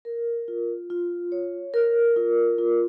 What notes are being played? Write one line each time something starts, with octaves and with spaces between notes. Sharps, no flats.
A#4
F4
F4
C#5
A#4
F4
F4